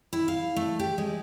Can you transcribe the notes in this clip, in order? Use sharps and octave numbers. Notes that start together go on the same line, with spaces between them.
E4
F5
A3
G4
G#3